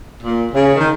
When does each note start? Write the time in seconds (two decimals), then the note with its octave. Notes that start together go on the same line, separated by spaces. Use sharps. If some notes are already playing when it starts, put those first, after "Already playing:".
0.23 A#2
0.52 C#3
0.76 D#3